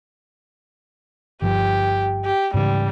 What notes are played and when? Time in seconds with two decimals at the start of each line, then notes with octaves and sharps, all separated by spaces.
1.42 G1 G2 F3 G4
2.25 G4
2.54 G#2 C#3 E3 G3